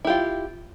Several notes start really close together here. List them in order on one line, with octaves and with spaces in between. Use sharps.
E4 G4 F4